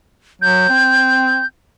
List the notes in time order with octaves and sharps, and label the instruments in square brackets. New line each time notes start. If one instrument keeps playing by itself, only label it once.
[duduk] F#3 [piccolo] G6
[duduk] C4